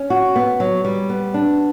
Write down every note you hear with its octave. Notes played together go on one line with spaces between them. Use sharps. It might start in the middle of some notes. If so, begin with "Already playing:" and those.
Already playing: C#4
F#4
B3
F#3
G3
B3
D4